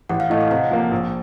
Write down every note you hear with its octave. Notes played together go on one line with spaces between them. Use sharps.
A1 F#5
F5
A2 A3 D#5
F5
C3 F#5
F3 A#3
A#1